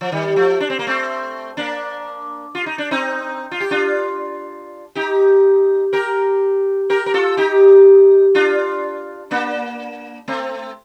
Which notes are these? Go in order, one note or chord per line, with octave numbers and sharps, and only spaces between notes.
F3
D#3 G3
F3 A3
D4
C4
A#3
A3 C4
A#3 D4
F4
D#4
D4
C4 D#4
F4
G4
D4 F4
D#4 G4
G4 A#4
G4 A#4
A#4
F4 A4
D#4 G4
D4 F4
A#3 D4
A3 C4